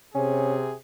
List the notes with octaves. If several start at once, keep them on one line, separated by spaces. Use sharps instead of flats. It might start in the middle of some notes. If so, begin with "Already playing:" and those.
C3 C#4 G#4